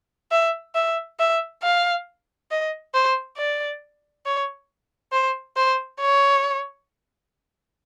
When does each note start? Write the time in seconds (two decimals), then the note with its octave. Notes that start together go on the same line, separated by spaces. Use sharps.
0.32 E5
0.75 E5
1.19 E5
1.63 F5
2.51 D#5
2.94 C5
3.37 D5
4.26 C#5
5.13 C5
5.57 C5
6.01 C#5